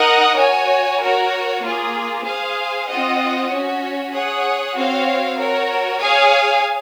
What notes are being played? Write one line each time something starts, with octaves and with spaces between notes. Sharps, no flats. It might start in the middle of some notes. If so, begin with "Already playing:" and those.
Already playing: D#4 A#4 D#5 F#5
F#4 C#5 G#5
F#4 A#4 C#5
A#3 F4 G#4
G#4 C5 F5 G#5
C4 F4 C5 D#5 F#5
C#4 F#4 C#5
G#4 C#5 F#5
C4 F#4 C#5 F5
F#4 A#4 C#5
G#4 C#5 F5 G#5